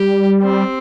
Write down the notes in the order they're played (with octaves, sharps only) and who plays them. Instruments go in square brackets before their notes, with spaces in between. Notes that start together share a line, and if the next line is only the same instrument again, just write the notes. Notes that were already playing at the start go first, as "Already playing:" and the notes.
Already playing: [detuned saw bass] G3 [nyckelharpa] G4
[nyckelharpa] C4